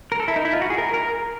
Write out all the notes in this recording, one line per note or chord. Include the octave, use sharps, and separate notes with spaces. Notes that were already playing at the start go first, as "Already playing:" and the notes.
A#4
A4
E4
D#4
E4
F4
F#4
G#4
A#4
A#4